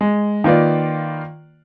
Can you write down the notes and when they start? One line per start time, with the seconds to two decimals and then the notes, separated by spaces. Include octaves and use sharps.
0.01 G#3
0.44 D#3 A#3 F4 B4 D5